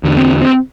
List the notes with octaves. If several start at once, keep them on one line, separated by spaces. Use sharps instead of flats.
E2 D3
C4
C4